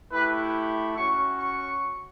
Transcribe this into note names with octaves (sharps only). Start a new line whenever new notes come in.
A3 E4 G4 B4
C#4 F#4 C#6
C#6